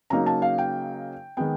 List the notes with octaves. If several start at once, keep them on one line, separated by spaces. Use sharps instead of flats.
C#3 F#3 A#3 D#4 A#5
A5
F5
G5
D#3 G#3 B3 G5